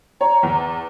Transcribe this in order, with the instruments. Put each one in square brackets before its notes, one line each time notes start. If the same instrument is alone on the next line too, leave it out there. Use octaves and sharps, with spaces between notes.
[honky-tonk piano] C#5 [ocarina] A#5
[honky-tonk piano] E2